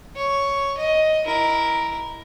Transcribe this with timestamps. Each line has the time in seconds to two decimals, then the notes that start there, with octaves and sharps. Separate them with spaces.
0.16 C#5
0.77 D#5
1.25 E4 A#4